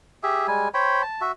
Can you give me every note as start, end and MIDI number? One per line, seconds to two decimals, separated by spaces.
0.23 0.47 67
0.23 0.47 68
0.23 0.47 76
0.48 0.68 55
0.48 0.68 56
0.48 0.68 80
0.74 1.02 72
0.74 1.02 73
0.74 1.02 79
0.74 1.02 83
1.02 1.21 81
1.21 1.32 66
1.21 1.32 76